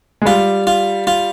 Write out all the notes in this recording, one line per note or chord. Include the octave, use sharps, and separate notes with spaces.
G#3
G3 F4
F4
F4